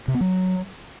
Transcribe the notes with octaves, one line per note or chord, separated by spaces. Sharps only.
C3
B3
F#3